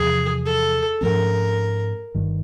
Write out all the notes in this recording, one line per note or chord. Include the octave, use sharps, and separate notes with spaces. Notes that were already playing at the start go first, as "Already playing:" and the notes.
Already playing: E2 C3 F3 G#4
A4
G#2 F3 A3 C#4 A#4
G1 G2 D#3